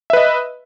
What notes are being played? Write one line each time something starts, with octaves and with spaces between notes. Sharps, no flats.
B4 D#5 E5